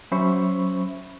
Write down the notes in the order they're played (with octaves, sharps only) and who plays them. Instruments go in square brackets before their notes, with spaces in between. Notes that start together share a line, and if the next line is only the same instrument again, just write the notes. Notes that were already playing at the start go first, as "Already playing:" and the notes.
[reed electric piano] F#3 C#4 C5 E5 B5 C#6